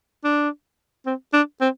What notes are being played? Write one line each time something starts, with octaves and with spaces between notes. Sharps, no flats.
D4
C4
D4
C4